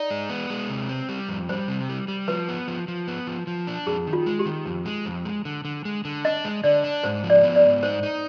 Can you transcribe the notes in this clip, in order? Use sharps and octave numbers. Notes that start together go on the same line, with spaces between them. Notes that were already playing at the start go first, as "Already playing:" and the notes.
Already playing: D#4 D5
G#3
B3
G#3
C3
C4
G3
F2
G3 C5
C3
G3
G3
F3 B4
B3
F3
F3
B3
F3
F3
D4
F2 G#4
D#3
F4
G#3
G4
D#3
F2
G#3
F2
G#3
D3
D3
G#3
D3
D4 D#5
G#3
D3 D5
D4
G#2 C5
F3
D5
B3
D5
G#2
D#4 C5
D#4